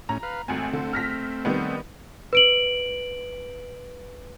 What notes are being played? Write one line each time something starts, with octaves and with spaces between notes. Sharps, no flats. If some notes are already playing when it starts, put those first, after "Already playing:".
A2 C#4 A#5
B4 F5
G#1 A3 C4 G#5
D3
F6 A#6 B6
D#3 G3 B3
B4 D7 F#7